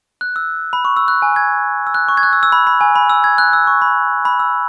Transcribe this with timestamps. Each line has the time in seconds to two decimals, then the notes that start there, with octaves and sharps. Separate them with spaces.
0.21 F#6
0.36 E6
0.73 B5
0.85 C#6
0.97 E6
1.08 F#6
1.22 G#5
1.36 G#6
1.87 E6
1.94 F#6
2.09 C#6
2.17 G#6
2.23 F#6
2.33 E6
2.43 E6
2.52 B5
2.67 B5
2.81 G#5
2.96 B5
3.10 E6
3.24 G#6
3.38 F#6
3.53 E6
3.67 C#6
3.82 B5
4.25 B5
4.40 E6